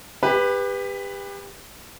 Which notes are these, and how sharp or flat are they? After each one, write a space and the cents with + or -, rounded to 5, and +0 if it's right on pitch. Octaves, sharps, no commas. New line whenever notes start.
G4 +30 B4 +0